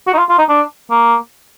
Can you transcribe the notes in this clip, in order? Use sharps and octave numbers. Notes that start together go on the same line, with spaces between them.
F#4
D#4
F4
F4
D#4
D4
A#3